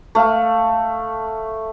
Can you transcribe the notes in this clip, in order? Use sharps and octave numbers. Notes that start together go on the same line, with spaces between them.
A3 F5